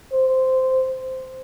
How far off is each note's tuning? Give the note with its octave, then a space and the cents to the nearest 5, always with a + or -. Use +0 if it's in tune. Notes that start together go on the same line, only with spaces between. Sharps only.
C5 -10